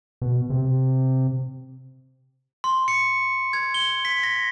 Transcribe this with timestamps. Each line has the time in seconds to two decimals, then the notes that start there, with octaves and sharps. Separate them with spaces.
0.22 B2
0.50 C3
2.64 C6
2.88 C#7
3.53 G#6
3.74 G7
4.05 B6
4.23 A#6